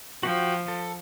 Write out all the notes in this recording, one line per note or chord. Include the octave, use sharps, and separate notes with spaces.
F3 F#4 G5
A4